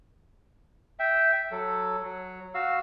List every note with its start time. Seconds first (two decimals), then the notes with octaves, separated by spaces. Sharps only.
0.99 E5 G5
1.51 F#3 A4
2.03 F#3
2.54 F#4 F5 E6